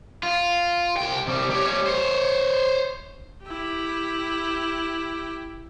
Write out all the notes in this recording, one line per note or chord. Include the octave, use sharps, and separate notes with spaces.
F4
C2 G5
C3 G3
G4 C#5
G3 C#5
C5 C#5
E4 G4